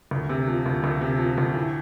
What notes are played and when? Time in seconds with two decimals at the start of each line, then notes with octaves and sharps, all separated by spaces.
0.11 D2
0.29 C3
0.48 F3
0.66 D2
0.84 D2
1.01 C3
1.19 F3
1.38 D2
1.55 A2